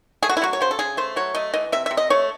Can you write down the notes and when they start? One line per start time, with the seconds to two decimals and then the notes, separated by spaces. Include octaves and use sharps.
0.22 A3 G#4
0.29 F#4
0.37 E4
0.42 F#3 F#4
0.53 C#5
0.61 C#3 C5
0.71 A4
0.79 C#3 G#4
0.97 A3 C5
1.16 F#3 C#5
1.35 A3 D#5
1.54 E3 D#5
1.72 C3 E5
1.86 C3 E5
1.97 D#5
2.10 A3 C#5